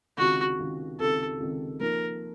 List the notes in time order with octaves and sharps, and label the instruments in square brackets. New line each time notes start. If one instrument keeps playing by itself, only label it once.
[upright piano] C#2 C3 D#3 [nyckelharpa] F#4
[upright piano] C#2 C3 D#3
[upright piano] C#2 C3 D#3 [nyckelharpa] A4
[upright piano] C#2 C3 D#3
[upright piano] F3 A#3 D#4 [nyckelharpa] A#4